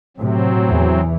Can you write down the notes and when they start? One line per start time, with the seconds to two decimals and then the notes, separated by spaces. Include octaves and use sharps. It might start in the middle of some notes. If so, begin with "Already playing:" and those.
0.17 A2 C3 F#3 C4
0.68 E2 E3